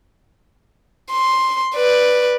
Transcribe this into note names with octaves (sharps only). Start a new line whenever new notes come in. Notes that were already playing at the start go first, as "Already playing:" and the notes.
C6
B4 D5